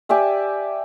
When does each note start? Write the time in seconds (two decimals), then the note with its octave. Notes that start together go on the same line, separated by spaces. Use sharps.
0.09 G4 D5 E5 G#5